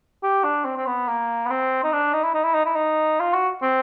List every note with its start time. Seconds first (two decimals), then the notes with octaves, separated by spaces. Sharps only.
0.23 G4
0.44 D4
0.65 C4
0.77 C4
0.87 B3
1.08 A#3
1.46 B3
1.50 C4
1.84 D#4
1.93 D4
2.13 D#4
2.24 E4
2.34 D#4
2.44 E4
2.54 D#4
2.65 E4
2.75 D#4
3.20 F4
3.34 F#4
3.62 C4